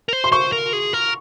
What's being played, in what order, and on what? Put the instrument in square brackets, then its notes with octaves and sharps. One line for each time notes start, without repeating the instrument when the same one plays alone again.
[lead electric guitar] A#4
C5
[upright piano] C6
[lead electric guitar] C5 [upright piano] C#6
[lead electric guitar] A#4
G#4
A#4